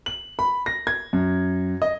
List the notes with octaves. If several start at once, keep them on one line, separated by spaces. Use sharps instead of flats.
F#7
B5
A#6
G#6
F#2
D#5